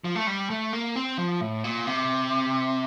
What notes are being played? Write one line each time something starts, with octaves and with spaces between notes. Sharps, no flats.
F3
A3
G3
A3
A#3
C4
F3
A2
A#2
C3